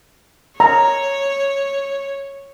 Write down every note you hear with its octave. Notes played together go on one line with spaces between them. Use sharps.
C#5 A#5